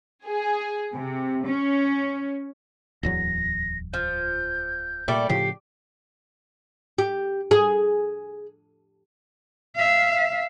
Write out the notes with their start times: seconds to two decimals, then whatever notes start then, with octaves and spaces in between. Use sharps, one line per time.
0.25 G#4
0.94 C3
1.46 C#4
3.03 D1 E2 F#3 A#6
3.94 F3 G6
5.08 A#2 G3 A3 D5
5.29 A2 C#3 F3 G4 C7
6.98 G4
7.51 G#4
9.76 E5 F5